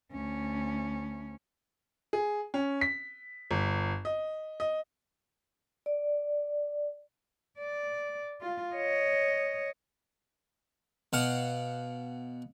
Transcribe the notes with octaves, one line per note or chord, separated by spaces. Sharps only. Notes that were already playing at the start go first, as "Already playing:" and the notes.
D2 C#4
G#4
C#4
B6
G1
D#5
D#5
D5
D5
F4
C#5 D#5
B2 F5 F#5